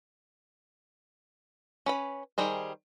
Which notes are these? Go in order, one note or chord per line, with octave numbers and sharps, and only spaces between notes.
C#4 B4 B5
D#3 G3 G#4 C5